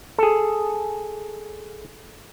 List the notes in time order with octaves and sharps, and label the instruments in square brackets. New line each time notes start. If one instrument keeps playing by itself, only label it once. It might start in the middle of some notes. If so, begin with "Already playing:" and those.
[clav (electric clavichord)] G#4 A4